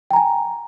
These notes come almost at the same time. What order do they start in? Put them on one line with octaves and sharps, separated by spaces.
G5 A#5 G#5